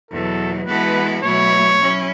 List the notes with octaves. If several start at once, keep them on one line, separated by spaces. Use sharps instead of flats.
E2 B2 F#3 A4
E3 G#3 B3 F#4 A4 B4
B2 F#3 A3 E4 C#5
F#3 C#4 E4